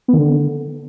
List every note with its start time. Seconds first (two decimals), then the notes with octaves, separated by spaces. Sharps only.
0.08 B3
0.13 D#3
0.19 D3